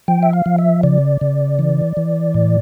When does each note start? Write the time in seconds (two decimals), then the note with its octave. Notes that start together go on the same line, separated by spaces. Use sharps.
0.08 F3 G5
0.23 E5
0.33 F5
0.46 F3
0.58 E5
0.83 C#3 D5
1.21 C#3
1.59 E3
1.97 E3
2.34 A2